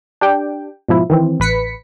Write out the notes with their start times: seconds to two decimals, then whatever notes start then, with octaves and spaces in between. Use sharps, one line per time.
0.21 D4 G4 G5
0.89 G#2 B2 F3 E4
1.10 D#3 E3 C4
1.40 A1 B4 B6 C#7